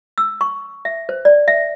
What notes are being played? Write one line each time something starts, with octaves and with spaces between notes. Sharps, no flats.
E6
C#6
E5
C5
D5
E5